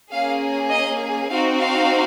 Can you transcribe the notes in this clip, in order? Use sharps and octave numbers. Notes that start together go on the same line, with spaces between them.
A#3 C#4 G#4 F5
D#5
C4 D#4 F#4 F5
F5